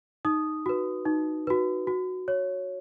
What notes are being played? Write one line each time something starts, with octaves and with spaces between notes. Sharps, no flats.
D#4 D#6
F#4 B4
D#4
F#4 B4
F#4
C#5